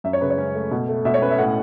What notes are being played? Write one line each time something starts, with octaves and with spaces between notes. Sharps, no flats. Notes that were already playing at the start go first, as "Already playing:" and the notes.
F#2 E5
C#5
C#3 B4
C#5
C#4
A3
B2
A3
B2 E5
C#5
C#4 B4
E5
A2 F#5